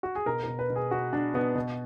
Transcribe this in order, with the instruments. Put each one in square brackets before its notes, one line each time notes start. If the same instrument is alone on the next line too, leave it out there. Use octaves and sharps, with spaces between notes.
[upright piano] F#4
G#4
B2 A#4
B2 A#4
B4
B2
G#4
B2 F#4
B2 D4
B2 B3
B2